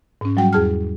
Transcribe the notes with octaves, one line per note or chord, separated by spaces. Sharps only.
G#2 C#4
F#3 G3 F#4 G5
E2 G#4 A5 F6